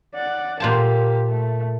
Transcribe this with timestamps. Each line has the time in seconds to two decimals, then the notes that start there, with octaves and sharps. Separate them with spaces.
0.15 D5 F#5
0.60 A#2 A#3 G4 C5 A5
1.28 A3